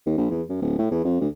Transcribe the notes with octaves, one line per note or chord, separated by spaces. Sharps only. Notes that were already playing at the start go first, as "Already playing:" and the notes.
D#2
A#1
E2
F#2
D1
A2
E2
F2
D2